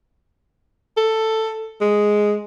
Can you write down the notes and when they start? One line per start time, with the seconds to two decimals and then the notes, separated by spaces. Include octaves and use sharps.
0.97 A4
1.81 G#3